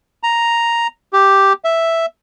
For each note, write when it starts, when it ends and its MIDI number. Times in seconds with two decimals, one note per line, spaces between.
0.23 0.87 82
1.13 1.53 67
1.64 2.06 76